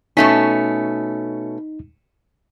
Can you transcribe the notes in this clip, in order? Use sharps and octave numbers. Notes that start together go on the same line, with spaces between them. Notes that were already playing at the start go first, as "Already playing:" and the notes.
B2 A3 C#4 D#4 B6